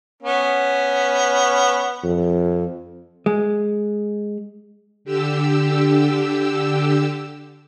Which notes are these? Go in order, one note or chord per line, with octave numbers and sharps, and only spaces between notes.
B3 C#4
F2
G#3
D3 G4 E6